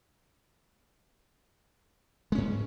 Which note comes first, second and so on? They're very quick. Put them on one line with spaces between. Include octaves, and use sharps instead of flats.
G#3 C#4 G#2